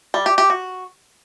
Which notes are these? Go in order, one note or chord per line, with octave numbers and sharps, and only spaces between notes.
G3
G4
G4
F#4